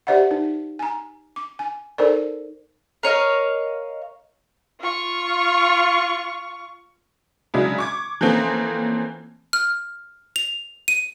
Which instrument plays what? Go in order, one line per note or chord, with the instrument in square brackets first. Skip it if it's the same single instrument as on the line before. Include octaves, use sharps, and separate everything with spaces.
[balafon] G4 C5 D5 E5 F#5
D#4
G#5 A#5
D6
G#5
D#4 A4 A#4 C5 D5
[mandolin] A#4 C#5 D#5 F5
[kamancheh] F4 C#6
[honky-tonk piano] C#3 F#3 G#3 D4 E4
C#6 D6 G#6
E3 F3 A3 A#3 C4 C#4
[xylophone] F6
F7
D#7